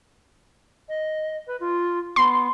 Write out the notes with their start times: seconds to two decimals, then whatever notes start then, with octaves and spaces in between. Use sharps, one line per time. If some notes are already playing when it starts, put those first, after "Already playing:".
0.89 D#5
1.47 B4
1.60 F4
2.16 B3 C6